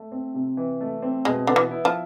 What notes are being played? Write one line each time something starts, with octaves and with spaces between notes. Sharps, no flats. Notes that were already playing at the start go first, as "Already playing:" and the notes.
Already playing: A3
C4
C3
E3
A3
C4
B2 G#3
D3 B3
E3
E4
F3